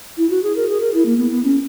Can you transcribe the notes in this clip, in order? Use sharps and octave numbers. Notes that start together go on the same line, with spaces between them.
E4
F#4
G#4
A#4
G#4
A#4
E4
A#3
B3
B3
C#4